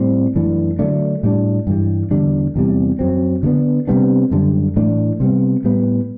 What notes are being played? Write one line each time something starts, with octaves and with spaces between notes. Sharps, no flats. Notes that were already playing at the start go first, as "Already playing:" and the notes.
Already playing: A2 G3 C4
F#2 E3 A3 D4
D3 F#3 A3 D4
A2 G3 D4
G2 E3 G3
E2 D3 G3 D4
E2 C3 G3
F#2 F#3 C4
D3 G3 B3 D4
C3 G3 B3 D4
F#2 D3 G3
A2 E3 A3 D4
C3 G3 B3
A2 G3 B3